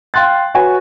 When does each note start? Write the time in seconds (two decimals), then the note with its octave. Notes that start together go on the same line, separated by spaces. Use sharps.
0.14 F5 G5 C6 F#6 A6
0.55 F#4 B4 C#5 G#5 C#6